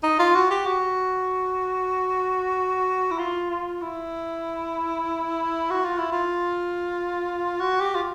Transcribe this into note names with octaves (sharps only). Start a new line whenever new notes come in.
D#4
F4
F#4
G4
F#4
E4
F4
F4
E4
F#4
F4
E4
F4
F#4
G4
F4